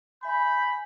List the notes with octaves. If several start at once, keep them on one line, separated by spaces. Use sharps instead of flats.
E5 G#5 B5 G6